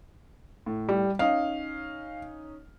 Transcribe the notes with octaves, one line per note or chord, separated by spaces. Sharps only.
A2
G3
C#4 D#4 F5